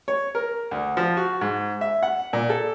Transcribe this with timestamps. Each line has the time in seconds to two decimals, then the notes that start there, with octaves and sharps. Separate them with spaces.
0.08 C#5
0.35 A#4
0.71 D2
0.97 F3
1.17 F#4
1.41 G#2
1.81 E5
2.03 F#5
2.33 A#2
2.50 A4